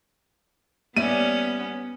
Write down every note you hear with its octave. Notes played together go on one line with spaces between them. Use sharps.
G3 A#3 B3 C#4 D5 E5 D#7